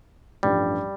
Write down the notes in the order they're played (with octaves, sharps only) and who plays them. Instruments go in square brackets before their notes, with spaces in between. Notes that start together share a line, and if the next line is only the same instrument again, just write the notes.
[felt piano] A1 G2 F3 [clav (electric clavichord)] G3